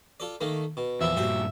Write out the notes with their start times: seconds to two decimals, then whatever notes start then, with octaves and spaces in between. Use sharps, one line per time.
0.20 F4 A4 D5
0.41 D#3 A3 A#3
0.77 B2
1.01 E2 A#2 E3 F3 E5
1.17 G2 A#2 F#4 G4 C5